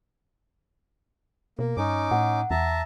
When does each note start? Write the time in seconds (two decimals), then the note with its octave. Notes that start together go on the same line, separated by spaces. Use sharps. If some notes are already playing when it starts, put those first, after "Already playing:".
1.59 B2 A#3
1.77 G2 C#4 D#4 D6
2.11 A2 F#5
2.51 E2 E5 A5 A#5